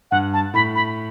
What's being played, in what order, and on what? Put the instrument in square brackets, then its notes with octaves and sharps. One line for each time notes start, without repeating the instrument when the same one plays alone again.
[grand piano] G2 [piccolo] F#5
[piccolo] A5
[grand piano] A2 [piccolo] B5
[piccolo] B5